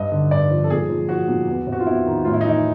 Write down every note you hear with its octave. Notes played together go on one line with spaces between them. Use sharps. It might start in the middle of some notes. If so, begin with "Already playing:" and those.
Already playing: G2 D#5
D3
G2 D5
F3
A4
A#2 G#4
F3
F3 F#4
A#2
E2
C3
F#4
F4
E2 E4
D#3
A2 F4
E4
D#4
E3 E4